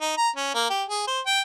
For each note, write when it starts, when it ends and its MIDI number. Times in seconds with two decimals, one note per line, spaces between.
0.01 0.12 63
0.17 0.30 82
0.36 0.51 61
0.55 0.69 58
0.70 0.84 67
0.89 1.03 68
1.07 1.20 72
1.26 1.41 79